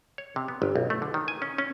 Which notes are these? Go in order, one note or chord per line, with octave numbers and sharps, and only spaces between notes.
C#5
C3
B3
G1
B1
A3
D3
D#3
G#5
C#4
C#4